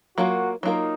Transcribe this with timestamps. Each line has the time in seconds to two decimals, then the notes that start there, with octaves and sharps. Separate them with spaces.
0.18 F#3 A#3 F4 F#4 A#4
0.63 F#3 A#3 D#4 F4 A#4